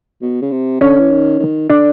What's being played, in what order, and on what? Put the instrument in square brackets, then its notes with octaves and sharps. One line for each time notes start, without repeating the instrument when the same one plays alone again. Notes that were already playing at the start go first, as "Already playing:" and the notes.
[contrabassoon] B2
C#3
C3
[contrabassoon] D3 [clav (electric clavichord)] C#4
[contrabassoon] E3
D#3
D#3
[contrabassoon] D3 [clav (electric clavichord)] D4